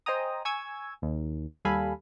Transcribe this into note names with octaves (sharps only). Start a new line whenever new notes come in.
C5 D#5 G5 G#5 A#5 D#6
G#5 C#6 E6 G#6
D#2
D#2 G3 A4 F5 G#5 B5